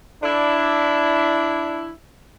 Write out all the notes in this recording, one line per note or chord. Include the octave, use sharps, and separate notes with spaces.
D4 E4